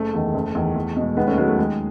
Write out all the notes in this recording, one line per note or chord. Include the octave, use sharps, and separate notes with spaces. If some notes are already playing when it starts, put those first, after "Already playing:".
Already playing: F#1 A3
E2 D#3
F#1
E2 D#3
E2
B2 G#3
D#2 G#3 B3
A3 C#4
D#3 F#3 G#3 B3
A3
D#2 G#3